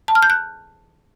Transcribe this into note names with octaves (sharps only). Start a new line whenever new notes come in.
A5
F6
G6
F#6